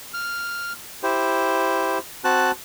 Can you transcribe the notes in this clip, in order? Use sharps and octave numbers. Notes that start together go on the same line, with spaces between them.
F6
E4 G4 C5
C4 F#4 A5 F#6